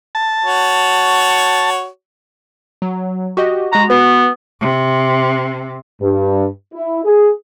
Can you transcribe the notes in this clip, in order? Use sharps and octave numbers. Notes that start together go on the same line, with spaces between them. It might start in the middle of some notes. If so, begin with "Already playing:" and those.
A5
F#4 C#5
F#3
F#4 G4 D#5
G#3 F#4 A#5
B3 F#4 B4
C3
G2
E4
G#4